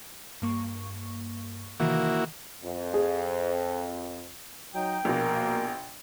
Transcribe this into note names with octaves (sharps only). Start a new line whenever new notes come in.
G2 A#3 C#6
C3 D#3 E3 A#3 E4 F#4
F2
G#4
F#3 D#4 G5
A#1 B2 A#3